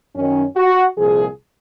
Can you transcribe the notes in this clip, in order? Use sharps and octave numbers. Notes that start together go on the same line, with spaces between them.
F#2 D#3 C#4
F#4
C2 A#2 F3 G#4